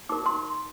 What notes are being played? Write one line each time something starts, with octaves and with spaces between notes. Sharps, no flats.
D#4 A#4 D6
C6